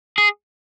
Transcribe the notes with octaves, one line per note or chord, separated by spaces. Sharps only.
G#4